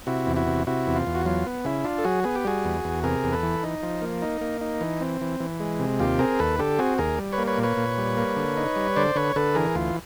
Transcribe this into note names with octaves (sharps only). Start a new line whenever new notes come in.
C3 E4 F#4
E2
E4 F#4
C3
C3 E4 F#4
E2
F4
E2
F#4
F#3 F4
B3
C#3 E4
D4 F4
A4
F#3 F#4 G#4
B3 G#4
G4
G3 F#4 G#4
E2
E2
C3 G#4 A#4
E2
A4 B4
E3
D#4
F3
A#3
D#4
A#3
D#4
E3
C4
E3
E3
G#3
C3
D#2 F4 G4
C4 G#4 A#4
D#2 A4 B4
D3 G4 A4
C4 F#4 G#4
D#2 G#4 A#4
G3
B4 C#5
A#3
B4 C#5
A#2
B4 C#5
A#2
G3
A#3
D3
D#4
G3
D3 C5 D5
D3 B4 C#5
D3 A4 B4
E3 G#4 A#4
D2 F4